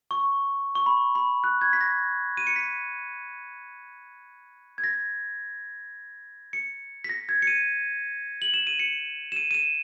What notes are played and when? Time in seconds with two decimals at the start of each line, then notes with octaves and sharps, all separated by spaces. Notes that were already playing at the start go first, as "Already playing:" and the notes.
0.11 C#6
0.75 C#6
0.86 B5
1.15 B5
1.44 F#6
1.61 G#6
1.73 B6
1.81 A#6
2.37 D#7
2.47 C#7
2.56 B6
4.78 G#6
4.84 A#6
6.53 C#7
7.04 B6
7.09 A#6
7.29 G#6
7.42 C#7
7.47 D#7
8.42 F#7
8.54 E7
8.67 D#7
8.79 C#7
9.32 E7
9.36 D#7
9.51 D#7
9.55 E7